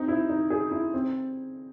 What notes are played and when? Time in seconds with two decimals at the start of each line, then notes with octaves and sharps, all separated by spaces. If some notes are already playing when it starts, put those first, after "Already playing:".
Already playing: C4 D#4
0.08 E4
0.29 D#4
0.50 G#4
0.71 E4
0.94 C4